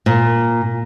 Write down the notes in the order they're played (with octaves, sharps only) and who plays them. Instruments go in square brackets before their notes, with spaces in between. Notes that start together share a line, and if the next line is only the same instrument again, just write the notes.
[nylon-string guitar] A#2